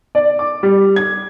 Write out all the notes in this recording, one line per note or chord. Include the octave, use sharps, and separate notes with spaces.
D5
D6
G3
G#6